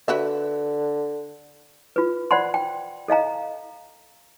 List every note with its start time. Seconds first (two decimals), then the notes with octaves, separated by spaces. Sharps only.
0.08 D3 F#4 B4 E5
1.96 F4 B4
2.31 C5 D5 F#5 B5 C6
2.54 G5
3.08 A4 D#5 F5 A#5